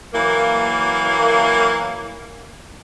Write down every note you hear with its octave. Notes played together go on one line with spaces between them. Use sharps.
E3 F#3 A#3